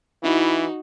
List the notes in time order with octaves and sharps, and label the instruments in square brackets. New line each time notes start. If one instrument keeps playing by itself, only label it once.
[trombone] E3 [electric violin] D#4 F#4 [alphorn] E4